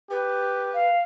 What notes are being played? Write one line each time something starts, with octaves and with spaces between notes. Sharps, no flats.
G4 B4
F5